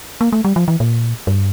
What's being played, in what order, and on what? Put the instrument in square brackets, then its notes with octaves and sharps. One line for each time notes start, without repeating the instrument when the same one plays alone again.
[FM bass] A#3
A3
G3
F3
E3
A#2
G2